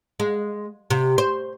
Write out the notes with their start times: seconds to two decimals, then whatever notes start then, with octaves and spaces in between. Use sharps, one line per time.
0.20 G#3
0.90 C3
1.18 C5